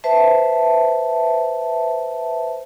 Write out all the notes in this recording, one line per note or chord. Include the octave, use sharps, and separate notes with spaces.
B4 C5 E5 A5